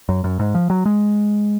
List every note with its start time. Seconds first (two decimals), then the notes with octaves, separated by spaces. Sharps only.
0.09 F#2
0.24 F#2
0.39 G#2
0.55 F3
0.70 F#3
0.85 G#3